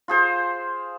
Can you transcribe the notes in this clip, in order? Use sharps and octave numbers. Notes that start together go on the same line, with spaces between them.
F4 G#4 C5